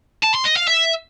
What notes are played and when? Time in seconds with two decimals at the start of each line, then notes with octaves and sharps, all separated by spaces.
0.24 A5
0.35 C6
0.46 D#5
0.57 F5
0.68 E5